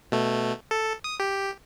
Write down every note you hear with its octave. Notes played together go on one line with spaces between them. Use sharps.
B2 A3
A4
D#6
G4